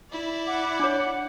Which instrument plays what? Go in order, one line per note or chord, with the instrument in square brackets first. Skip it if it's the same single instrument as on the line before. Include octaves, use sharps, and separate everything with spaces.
[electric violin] E4 D5
[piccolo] F#5 [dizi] D6
[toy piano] D4 C#5